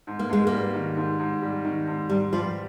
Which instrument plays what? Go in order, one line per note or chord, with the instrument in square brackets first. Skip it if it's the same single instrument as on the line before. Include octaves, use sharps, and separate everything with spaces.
[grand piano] G#2
[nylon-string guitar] A#3
[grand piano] G#2 [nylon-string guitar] G#3
[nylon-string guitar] A#3
[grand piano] G3
D#3
G#2
G#2
G3
D#3
G#2
[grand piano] G#2 [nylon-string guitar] G3
[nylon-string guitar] F3 [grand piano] G3